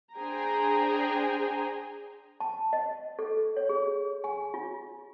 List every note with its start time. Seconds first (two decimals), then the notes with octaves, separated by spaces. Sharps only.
0.15 D4 G#4 C5 G5 G#5 A#5
2.40 A5
2.73 D#5
3.19 A4
3.57 C#5
3.69 G#4
4.24 G#5
4.54 F4